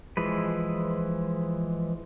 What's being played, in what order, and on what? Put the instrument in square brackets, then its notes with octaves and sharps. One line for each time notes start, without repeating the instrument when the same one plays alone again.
[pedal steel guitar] E3 F3 G#3 B4